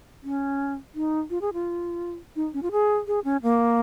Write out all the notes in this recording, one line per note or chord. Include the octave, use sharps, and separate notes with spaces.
C#4
D#4
F4
G#4
F4
D#4
C#4
F4
G#4
G#4
C#4
A#3